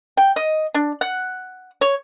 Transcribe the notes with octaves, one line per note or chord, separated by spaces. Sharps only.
G5
D#5
D4
F#5
C#5